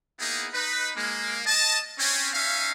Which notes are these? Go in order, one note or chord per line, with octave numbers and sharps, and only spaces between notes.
A#3 B3 D#4 E4 G#4
D#4 B4
G#3 A#3
D#5 A5
C4 C#4
C#4 D#4 E5 F5